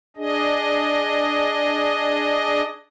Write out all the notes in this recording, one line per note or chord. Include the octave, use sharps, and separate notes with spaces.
D4 G#4 D#5